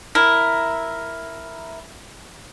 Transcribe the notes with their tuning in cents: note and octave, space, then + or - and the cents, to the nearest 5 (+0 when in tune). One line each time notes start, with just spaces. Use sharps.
E4 +0 A#4 +0